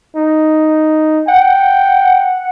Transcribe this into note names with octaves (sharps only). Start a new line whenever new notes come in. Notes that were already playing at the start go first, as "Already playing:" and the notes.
D#4
F#5 G5